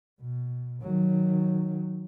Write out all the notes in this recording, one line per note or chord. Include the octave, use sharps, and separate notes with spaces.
B2
D#3 F#3